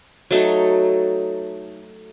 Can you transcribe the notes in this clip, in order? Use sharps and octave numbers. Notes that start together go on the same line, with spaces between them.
F#3 A3 D#4